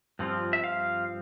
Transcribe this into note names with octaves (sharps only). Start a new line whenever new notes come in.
G2 F3 C4 F4
E5
F5